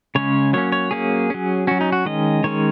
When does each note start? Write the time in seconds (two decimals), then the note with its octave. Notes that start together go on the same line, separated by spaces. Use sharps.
0.15 C#3 G#3 C#4 C#5
0.53 F#3 A#3 C#4 C#5
0.72 C#5
0.91 F#3 A#3 C#4 G#4
1.30 F#3 C#4
1.67 F#3 C#4 F#4
1.81 D#4
1.92 F#4
2.05 D#3 G#3 C#4 D#5
2.44 D#3 G#3 C#4 C#5